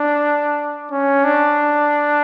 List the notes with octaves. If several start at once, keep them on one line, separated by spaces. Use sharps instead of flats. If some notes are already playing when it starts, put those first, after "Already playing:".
Already playing: D4
C#4
D4